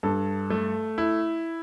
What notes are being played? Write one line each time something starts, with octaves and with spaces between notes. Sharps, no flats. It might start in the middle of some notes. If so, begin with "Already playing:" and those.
G2 A4
A3
E4